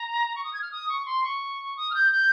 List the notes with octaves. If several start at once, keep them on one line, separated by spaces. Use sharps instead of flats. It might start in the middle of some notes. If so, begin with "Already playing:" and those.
Already playing: A#5
C#6
D#6
G#6
F6
D#6
C#6
C6
C#6
D#6
F6
G6
G6